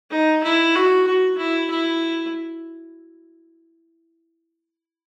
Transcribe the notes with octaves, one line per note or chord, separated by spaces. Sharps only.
D#4
E4
F#4
F#4
E4
E4